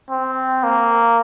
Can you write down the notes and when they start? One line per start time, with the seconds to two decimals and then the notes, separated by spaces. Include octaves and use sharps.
0.10 C4
0.63 A#3